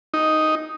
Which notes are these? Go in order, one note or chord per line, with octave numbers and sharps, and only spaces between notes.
D#4